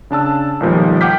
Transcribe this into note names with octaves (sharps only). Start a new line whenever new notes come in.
C#3 D4 A5 E6
B1 A#2 D#3 F3 G3
F#5 G5 D6 F6 G6 B6